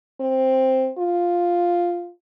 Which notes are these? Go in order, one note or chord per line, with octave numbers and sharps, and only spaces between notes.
C4
F4